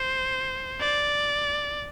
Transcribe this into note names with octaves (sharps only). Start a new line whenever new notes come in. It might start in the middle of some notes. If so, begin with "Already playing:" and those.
Already playing: C5
D5